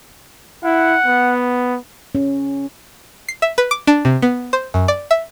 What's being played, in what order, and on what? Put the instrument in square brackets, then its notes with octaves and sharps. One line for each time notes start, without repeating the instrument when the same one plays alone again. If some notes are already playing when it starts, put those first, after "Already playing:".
[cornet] E4 [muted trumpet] F#5
[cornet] B3
[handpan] C#4
[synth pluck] C7
E5
B4
D6
D4
C3
B3
C5
F#2
D5
E5